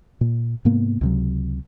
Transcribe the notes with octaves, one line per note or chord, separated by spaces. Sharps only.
A#2
G#2 C3 A#3 B3
C#2 C3 F#3